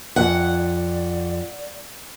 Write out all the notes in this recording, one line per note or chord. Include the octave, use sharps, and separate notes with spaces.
F2 D5 F#5